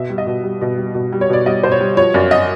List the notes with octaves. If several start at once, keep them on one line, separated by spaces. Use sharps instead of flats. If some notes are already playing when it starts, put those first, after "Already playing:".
Already playing: B2 E5
G3
D#5
B2
G3
B2
G3
B2
G3
C#5
B2 D5
G3 D#5
B2 C5
C#5
G3
F3 C#5
F#2 D5
D#5